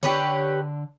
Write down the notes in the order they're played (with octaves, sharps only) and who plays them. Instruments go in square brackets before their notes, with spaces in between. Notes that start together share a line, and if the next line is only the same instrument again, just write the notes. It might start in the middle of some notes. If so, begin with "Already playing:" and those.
[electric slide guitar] D3 D5 [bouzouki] G4 B4 C#5